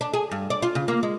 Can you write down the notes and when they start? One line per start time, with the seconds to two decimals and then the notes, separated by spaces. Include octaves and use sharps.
0.01 D4
0.14 G#4
0.31 G2
0.50 D5
0.62 F4
0.75 C#3
0.88 A#3
1.03 G#3